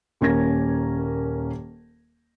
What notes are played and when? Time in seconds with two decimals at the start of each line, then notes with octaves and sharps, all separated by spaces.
0.21 D#1 A#3 C#4 A#4 G#6 A#6